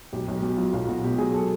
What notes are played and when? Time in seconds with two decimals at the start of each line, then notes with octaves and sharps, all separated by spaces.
0.13 B1 G4
0.28 B1
0.42 B2 G4
0.57 F#3 F4
0.73 B1 F4
0.88 B1 F#4
1.04 B2 G4
1.18 F#3 G#4
1.35 A4